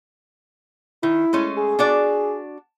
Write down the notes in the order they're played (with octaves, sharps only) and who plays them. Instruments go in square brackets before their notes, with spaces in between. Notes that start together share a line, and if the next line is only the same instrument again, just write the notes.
[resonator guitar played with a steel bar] D#3 [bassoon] E4
[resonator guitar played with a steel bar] G#3 A3 C#4
[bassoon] G#4
[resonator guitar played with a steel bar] D4 F#4 D5